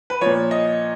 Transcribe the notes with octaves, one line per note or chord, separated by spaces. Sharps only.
B4
A#2 F3 C#5
D#5